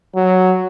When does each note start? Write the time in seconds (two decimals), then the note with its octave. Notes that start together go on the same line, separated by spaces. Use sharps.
0.16 F#3